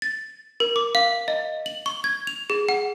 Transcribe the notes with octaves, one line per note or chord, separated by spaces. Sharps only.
A6
A#4
D6
F5
D#5
F#7
C#6
G#6
F7
G#4
F#5